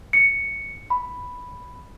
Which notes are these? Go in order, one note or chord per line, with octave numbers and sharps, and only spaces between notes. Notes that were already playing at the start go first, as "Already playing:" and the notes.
C#7
B5